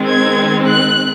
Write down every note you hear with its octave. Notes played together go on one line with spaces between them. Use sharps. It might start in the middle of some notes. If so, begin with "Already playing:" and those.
Already playing: D#3 G#3 C4
G#6
F#6